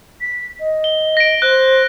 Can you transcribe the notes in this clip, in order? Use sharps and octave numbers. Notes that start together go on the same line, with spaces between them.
B6
D#5
G7
A#6 D7
C5 F#6